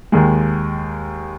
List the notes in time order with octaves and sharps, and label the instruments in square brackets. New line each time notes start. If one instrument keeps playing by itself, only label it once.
[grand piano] D#2 D#3 G#3